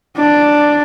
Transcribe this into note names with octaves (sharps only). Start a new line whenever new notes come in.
D4 D5